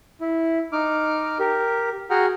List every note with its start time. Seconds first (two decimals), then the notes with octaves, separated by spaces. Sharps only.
0.21 E4
0.73 D#4 D6 F6
1.39 G4 A#4
2.10 F#4 G#4 F#5 G5 A#5 F6